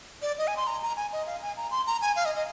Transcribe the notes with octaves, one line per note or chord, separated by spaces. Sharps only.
D5
D#5
G#5
C6
A#5
A#5
G#5
D#5
F5
G#5
A#5
C6
A#5
G#5
F5
D#5
D#5